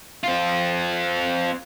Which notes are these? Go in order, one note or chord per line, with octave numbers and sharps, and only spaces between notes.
C4 F4